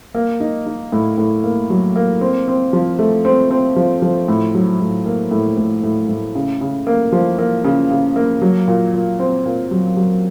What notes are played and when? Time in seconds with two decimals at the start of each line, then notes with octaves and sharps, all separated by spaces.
0.15 A#3
0.40 D#4
0.66 D#4
0.92 A2
1.18 A2
1.44 A#3
1.70 F#3
1.96 A#3
2.21 C4
2.48 C4
2.73 F3
2.99 A3
3.25 C4
3.51 C4
3.76 F3
4.02 F3
4.28 A2
4.54 F#3
4.80 A2
5.06 A#3
5.31 A2
5.57 A2
5.83 A2
6.09 A2
6.35 C#3
6.61 C#3
6.87 A#3
7.12 F3
7.39 A#3
7.64 C#3
7.91 C#3
8.16 A#3
8.42 F#3
8.67 A#2
8.94 A#2
9.19 C4
9.46 A#2
9.71 F#3
9.97 F#3